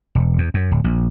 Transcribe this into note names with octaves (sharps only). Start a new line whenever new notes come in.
E1
E2
F#2
D1
A#1